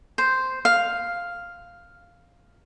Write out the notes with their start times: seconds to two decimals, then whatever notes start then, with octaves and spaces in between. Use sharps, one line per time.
0.18 C5
0.65 F5